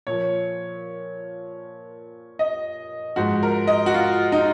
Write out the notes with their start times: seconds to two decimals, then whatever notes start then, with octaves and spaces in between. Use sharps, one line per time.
0.07 A#2 F3 C#5
2.39 D#5
3.16 G#2 F3 F#4
3.43 A#4
3.67 D#5
3.86 F#4
3.94 F4
4.32 D#4